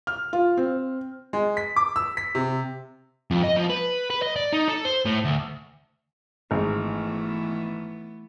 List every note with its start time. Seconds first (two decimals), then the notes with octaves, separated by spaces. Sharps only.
0.07 F6
0.33 F4
0.57 C4
1.33 G#3
1.57 B6
1.76 D6
1.96 E6
2.17 B6
2.35 C3
3.31 F2
3.44 D#5
3.56 F3
3.70 B4
4.10 B4
4.22 D#5
4.36 D5
4.53 D#4
4.68 A4
4.85 C5
5.06 A2
5.25 D2
6.51 G#1 E3 A3 B3